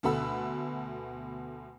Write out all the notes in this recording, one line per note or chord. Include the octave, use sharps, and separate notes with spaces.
D2 B2 A4 F#5 B5 E6